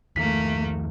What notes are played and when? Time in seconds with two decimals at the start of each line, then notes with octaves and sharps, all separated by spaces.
0.16 E2 D#3 F3 A3 A#3 B6